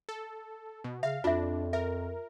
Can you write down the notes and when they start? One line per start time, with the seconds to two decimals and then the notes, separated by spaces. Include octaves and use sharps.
0.09 A4
0.84 B2
1.03 C#3 E5 F5
1.24 F2 D4 F4 E5
1.73 A#4 E5